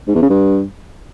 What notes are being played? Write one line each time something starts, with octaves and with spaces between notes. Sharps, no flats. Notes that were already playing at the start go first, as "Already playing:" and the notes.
G#2
E2
C#3
G2